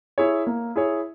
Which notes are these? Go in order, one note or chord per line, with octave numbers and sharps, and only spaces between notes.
E4 G#4 C#5
A#3
E4 G#4 C#5